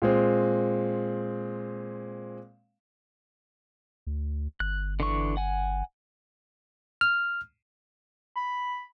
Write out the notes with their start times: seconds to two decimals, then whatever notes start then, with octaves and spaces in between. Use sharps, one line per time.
0.02 A#2 G#3 C4
4.07 D2
4.60 G1 F#6
5.00 D3 E3 C#6
5.37 F#5 G#5
7.01 F6
8.36 B5